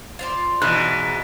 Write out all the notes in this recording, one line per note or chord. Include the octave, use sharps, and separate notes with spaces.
F4 C5 D5
G#2 B2 E3 F#6